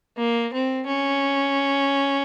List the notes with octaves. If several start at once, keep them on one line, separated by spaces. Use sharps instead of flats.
A#3
C4
C#4